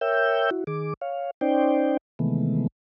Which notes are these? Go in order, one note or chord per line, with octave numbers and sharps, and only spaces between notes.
A#4 C#5 E5 G5 E6 G6
E4 F#4
D#3 G#4 D6
C#5 F5
C#4 D#4 C5 D5 G5
C3 D#3 E3 G#3 A3 B3